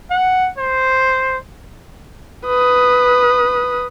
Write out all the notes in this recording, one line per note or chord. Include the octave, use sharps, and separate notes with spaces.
F#5
C5
B4 D#6